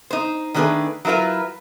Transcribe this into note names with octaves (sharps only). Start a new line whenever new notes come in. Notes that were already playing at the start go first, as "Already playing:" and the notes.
D#4 C5
D#3 A3 D4 G4 G#4 B4
F#3 E4 F4 A#4 B4